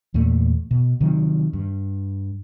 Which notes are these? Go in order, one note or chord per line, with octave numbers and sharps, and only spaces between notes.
E2 A#2 A3
B2
C3 D#3 F3 F#3
G2